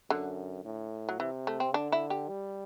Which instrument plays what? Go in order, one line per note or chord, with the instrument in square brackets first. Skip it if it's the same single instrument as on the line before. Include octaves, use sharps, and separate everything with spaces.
[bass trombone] F#2 [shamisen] D3
[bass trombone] A2
[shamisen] F#3
[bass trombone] C3 [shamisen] E3
[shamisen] A3
C4
[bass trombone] D3 [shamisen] D4
[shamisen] E4
G4
[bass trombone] G3